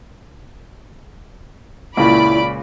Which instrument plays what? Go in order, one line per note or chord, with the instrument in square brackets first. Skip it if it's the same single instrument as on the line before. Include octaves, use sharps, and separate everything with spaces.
[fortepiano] C#2 A#2 C#3 [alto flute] E4 [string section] D5 B5 D6